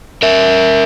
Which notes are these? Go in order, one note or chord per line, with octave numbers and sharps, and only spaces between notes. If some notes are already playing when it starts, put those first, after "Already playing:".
A#4 E5